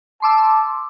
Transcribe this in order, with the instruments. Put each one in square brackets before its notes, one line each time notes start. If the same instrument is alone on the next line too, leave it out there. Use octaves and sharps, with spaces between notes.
[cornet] A5 [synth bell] C6 D6 E6